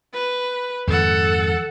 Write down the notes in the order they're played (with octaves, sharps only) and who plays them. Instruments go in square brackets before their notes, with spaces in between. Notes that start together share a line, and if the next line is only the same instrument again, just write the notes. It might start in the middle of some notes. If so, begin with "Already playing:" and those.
[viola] B4
[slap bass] F2 G#2 D#3 [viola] A4 F#5